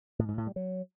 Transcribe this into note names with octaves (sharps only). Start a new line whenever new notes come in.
A2
G#2
A2
G3
F#3